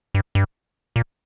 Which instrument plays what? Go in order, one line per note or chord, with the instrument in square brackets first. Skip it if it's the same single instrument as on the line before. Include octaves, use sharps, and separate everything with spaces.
[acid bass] G2
G2
A#2